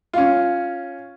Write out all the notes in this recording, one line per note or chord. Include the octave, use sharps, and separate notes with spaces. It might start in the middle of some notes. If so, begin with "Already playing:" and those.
C#4 F4